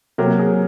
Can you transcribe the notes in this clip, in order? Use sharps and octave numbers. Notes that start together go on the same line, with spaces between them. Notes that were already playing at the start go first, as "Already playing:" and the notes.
C3 F#3 A#3 A#4
G#4